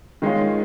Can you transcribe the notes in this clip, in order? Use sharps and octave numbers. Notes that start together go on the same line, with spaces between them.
D#3 G#3 C#4 F4